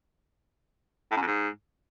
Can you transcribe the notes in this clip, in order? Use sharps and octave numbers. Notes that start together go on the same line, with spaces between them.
A2
F#2
F2
G#2